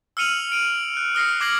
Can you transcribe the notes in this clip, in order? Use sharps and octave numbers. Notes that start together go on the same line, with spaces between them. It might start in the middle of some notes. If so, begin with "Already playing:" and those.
E6 F6 C#7 D#7 F7 F#7
D7 D#7
F#6
D#6 F6 A#6 C7 C#7
D6 F#6 G#6 A#6 C7 F#7